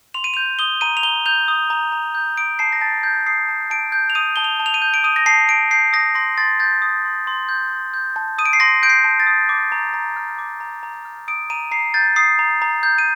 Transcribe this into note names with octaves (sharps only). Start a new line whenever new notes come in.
C6 F7
D#7
G6 F7
D#6 G7
A#5 D#7
F7
A#5 G7
G6 F7
D#6
A#5
A#5
G6
D#6 D7
A5 C7
A#6
A5 A6
G6
D#6 C7
A5
A5 D7
G6
F7
D#6 D#7
A5 G7
F7
A5
F7
D#7
G6
D7
D#6 D#7
A#6
A5 C7
A5 D7
G6 C7
D#6 A#6
C6 A#6
C6 A6
G6 A6
D#6
C6
C6
G6
C6
G6
A5
D#6 D#7
D7
C7
C6 A#6
G6 D7
C7
A5
A6
D#6
D6
A#5
A#5
F6
D6
A#5
A#5
F6
D#6 D7
A#5 D#7
A#5 C7
G6 A6
D#6 C7
A#5
A#5
G6
D#7